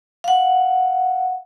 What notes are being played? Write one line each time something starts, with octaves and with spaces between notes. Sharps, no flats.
F5 F#5